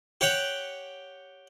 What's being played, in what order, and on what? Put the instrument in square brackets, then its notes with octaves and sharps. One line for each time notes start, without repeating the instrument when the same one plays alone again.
[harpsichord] G4 C#5 F#5 G5